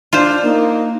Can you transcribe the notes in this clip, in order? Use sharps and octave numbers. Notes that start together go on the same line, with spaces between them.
D4 F4 C5
A#3 D#4